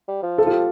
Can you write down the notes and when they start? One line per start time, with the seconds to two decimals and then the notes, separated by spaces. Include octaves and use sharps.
0.08 G3
0.23 F3
0.38 A4
0.46 F4
0.50 G4